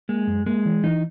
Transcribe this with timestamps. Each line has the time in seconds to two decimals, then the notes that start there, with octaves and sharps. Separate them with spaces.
0.09 G#3 A#3
0.28 F#2
0.46 G#3 A#3
0.66 E3
0.84 E3 D#4